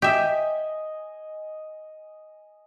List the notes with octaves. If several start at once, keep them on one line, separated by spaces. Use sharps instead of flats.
G4 D#5 E5 G#5